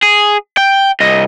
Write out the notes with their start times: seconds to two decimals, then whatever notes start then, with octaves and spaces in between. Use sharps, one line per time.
0.02 G#4
0.57 G5
1.00 C2 D#5